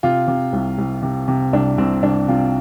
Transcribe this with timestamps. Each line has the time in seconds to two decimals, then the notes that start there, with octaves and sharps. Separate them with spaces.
0.03 C3 F4
0.28 C3
0.53 C2
0.78 C2
1.02 C3
1.28 C3
1.53 C2 D4
1.78 C2 C4
2.03 C2 D4
2.28 C3 F4